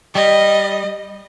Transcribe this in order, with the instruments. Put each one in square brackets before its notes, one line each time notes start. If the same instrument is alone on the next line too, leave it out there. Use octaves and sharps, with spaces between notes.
[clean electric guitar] G3 [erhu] D#5